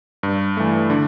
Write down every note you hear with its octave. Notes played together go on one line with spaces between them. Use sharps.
G2
E3 A3
D3